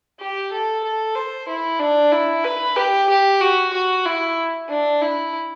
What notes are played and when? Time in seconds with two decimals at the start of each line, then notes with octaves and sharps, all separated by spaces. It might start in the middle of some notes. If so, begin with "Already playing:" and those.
0.20 G4
0.52 A4
0.84 A4
1.15 C5
1.48 E4
1.80 D4
2.12 E4
2.44 B4
2.76 G4
3.09 G4
3.41 F#4
3.73 F#4
4.06 E4
4.69 D4
5.02 E4